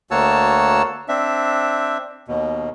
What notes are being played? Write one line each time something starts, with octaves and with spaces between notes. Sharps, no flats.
D2 A#3 F#4 C#5 A5 E6
C4 D4 E5
D#2 B2